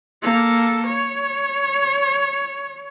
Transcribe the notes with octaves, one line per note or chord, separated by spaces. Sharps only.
A#3 A4
C#5